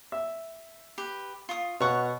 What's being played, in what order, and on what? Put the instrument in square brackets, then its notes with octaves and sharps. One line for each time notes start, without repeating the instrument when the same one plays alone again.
[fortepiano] E5
[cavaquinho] G4 B4
F4 C#6 D#6
[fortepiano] B2 C#6 [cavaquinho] C#5 F#5